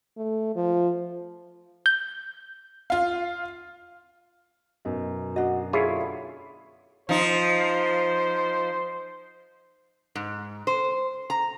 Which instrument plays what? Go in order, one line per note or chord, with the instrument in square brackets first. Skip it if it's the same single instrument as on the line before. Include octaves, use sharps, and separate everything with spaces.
[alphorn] A3
F3
[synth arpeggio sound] G6
[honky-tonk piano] F4 F5
[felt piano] F#2 B2 D#4
[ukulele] D4 D#5 [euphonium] F#4
[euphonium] D3 [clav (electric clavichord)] E4 F4 C#5 [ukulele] G#4
[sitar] F3 D#4 [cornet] C5
[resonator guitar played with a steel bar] G#2
C5
A#5